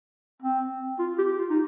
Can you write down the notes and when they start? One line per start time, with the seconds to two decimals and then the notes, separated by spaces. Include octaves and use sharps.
0.42 C4
0.99 F4
1.18 G4
1.38 F4
1.50 D#4